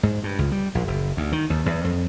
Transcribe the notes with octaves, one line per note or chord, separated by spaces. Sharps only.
G#2
G2
C#2
G3
A#1
F#1
D2
D#3
D#2
E2
F2